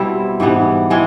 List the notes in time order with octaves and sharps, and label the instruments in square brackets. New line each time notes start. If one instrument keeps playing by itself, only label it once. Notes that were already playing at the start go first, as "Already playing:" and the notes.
Already playing: [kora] B2 G3 C4 E4
G#2 E3 G3 B3
E3 G#3 C4